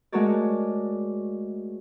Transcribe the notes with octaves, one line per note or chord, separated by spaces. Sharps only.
G#3 A3 F#4 A#4 C#5 D5